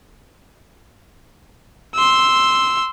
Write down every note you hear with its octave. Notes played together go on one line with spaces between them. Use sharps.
C6 E6